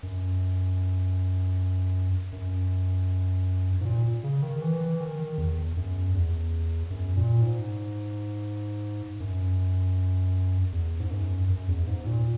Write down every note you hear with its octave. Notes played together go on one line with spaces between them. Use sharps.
F#2
F#2
G#2
A#2
C#3
D#3
E3
E3
D#3
D#3
E2
F#2
E2
F#2
A#2
G#2
F#2
E2
G#2
F#2
F#2
E2
G#2
A#2